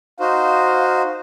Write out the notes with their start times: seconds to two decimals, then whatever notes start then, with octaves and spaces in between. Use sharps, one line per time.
0.20 D#4 F#4 C5 F5